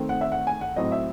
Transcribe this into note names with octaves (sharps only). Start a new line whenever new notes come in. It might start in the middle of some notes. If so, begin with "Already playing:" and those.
Already playing: D#3 A3 C4
F#5
E5
F#5
G#5
F#5
A2 F#3 C4 D#5
E5